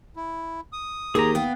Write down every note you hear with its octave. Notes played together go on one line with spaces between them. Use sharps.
E4
D#6
D#2 G4 G#4 A#4 C5 A#5
B3 F5 G5